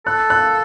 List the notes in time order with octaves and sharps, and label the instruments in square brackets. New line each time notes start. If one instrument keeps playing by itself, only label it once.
[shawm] A4 [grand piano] F#6
[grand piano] F#6